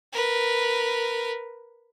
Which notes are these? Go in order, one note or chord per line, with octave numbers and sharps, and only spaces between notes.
A#4 B4